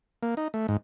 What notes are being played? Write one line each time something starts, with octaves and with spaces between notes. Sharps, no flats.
A#3
D#4
A3
G#2